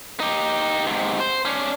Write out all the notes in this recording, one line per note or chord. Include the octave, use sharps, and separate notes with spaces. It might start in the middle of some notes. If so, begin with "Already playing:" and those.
D#4 G4
G#2 C3
C5
C#4 D4